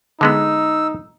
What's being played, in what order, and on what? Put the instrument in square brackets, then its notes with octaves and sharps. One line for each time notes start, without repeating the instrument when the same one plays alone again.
[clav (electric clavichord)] D3 G#3 B3 [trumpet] D#4 [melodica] E6